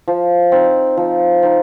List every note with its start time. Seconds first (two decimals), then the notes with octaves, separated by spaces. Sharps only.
0.08 F3
0.52 C4 D#4
0.97 F3
1.43 C4 D#4